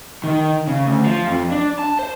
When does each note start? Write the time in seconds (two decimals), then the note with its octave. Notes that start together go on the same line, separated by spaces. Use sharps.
0.24 D#3
0.68 C#3
0.86 D2
1.05 F3
1.27 F2
1.51 D4
1.79 A5
1.99 C5